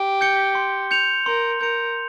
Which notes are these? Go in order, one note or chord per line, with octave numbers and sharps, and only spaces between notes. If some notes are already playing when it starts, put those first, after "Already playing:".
Already playing: G4
G6 C#7 G7
C6
G6 C#7 F7
A#4 C6
A#4 G6 C#7 F7